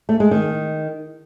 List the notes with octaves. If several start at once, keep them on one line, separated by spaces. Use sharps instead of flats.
A3
G#3
D#3